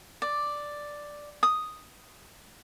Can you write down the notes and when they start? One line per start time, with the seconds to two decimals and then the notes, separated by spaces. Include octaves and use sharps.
0.22 D5
1.43 D#6